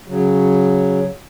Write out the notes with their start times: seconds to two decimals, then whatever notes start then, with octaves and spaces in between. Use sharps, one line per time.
0.08 C#3 F#3